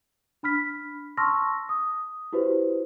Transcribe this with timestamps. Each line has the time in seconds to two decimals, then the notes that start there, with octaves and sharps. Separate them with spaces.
0.43 D4 B5 F6 B6
1.17 A5 C6 C#6 E6 F6 A#6
1.69 D#6
2.33 E4 F#4 G4 B4 C5